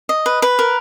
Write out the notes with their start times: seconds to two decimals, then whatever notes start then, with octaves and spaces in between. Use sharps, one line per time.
0.09 D#5
0.26 B4
0.42 B4
0.59 A#4